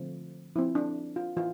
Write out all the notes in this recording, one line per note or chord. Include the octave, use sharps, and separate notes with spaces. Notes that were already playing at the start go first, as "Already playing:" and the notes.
Already playing: D3 F3 A3 C4
F3 C4 E4
D4
F4
E3 F4